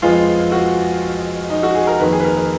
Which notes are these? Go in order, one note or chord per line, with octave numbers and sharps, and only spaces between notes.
F2 F3 G#3 B3 F4
F#4
D#4
F#4
G#4
A#4
F2 D#3 A#3 B4
G#4
B4
A#4
B4